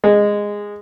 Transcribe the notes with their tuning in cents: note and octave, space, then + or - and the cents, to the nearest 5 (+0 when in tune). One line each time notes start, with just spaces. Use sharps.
G#3 -10